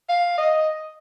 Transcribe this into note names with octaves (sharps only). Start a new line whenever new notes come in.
F5
D#5